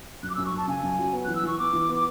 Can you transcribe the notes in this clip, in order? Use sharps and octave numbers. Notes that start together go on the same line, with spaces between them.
F#2 F#6
D6
F#2 E6
C#6
F#2 A5
C#3 G#5
F#2
F#3
B3
E3 F#6
E6
E3 C#6
B3 D6
E3
B3
D6